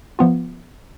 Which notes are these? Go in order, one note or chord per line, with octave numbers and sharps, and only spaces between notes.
F3 B3 F4